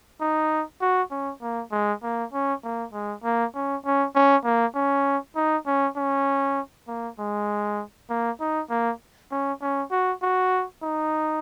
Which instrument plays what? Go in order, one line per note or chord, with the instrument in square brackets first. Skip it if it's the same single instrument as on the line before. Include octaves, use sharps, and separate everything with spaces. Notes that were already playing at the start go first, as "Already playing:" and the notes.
[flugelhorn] D#4
F#4
C#4
A#3
G#3
A#3
C#4
A#3
G#3
A#3
C#4
C#4
C#4
A#3
C#4
D#4
C#4
C#4
A#3
G#3
A#3
D#4
A#3
C#4
C#4
F#4
F#4
D#4